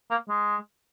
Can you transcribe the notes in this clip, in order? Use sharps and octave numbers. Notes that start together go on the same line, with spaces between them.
A#3
G#3